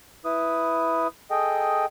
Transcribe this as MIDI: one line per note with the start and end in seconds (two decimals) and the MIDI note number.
0.25 1.07 64
0.25 1.07 71
0.25 1.07 87
1.31 1.86 68
1.31 1.86 69
1.31 1.86 75
1.31 1.86 79